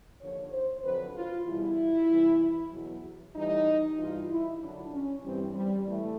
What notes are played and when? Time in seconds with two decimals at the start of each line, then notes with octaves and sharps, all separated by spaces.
0.20 D#2 D3 F3 C#5
0.52 C5
0.83 F2 D3 F#3 B4
1.14 F4
1.46 E2 B2 G3 E4
2.09 E2 C3 E3 G3
2.72 E2 B2 F#3
3.35 A2 E3 G3 D#4
3.98 G2 E3 G3 F4
4.30 E4
4.60 F#2 D3 F#3 D4
4.93 C#4
5.24 G2 E3 G3 C4
5.55 G3
5.87 A2 E3 G3 A3